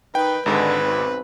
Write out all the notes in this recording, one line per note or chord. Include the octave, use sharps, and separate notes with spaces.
D#3 D#4 B4 G5
G#1 G#2 D3 G#3 B4
B1 C4